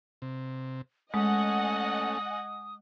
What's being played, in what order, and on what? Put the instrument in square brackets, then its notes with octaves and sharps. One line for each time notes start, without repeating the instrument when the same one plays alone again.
[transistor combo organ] C3
[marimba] G#3 [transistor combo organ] A3 C#4 [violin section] D#5 F#5 G#5 [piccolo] D#6